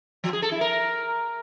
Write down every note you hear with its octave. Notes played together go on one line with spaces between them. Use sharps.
F3
G#4
A4
E4
A#4